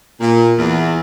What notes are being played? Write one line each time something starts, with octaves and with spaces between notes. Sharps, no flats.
A#2
E2